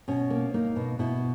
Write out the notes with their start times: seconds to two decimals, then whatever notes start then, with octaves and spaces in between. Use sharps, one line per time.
0.08 B2 C#4
0.30 A#3
0.54 A#3 D#4
0.76 B2
0.99 B2 E4